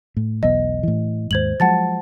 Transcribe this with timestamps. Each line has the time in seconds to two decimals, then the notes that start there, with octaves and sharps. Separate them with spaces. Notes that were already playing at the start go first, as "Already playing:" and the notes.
0.17 A2
0.43 E1 B1 B3 D#5
0.83 A2 E3
1.31 D#2 G#2 C5 G#6 F#7
1.60 F3 F#3 G#3 F#5 A5 A6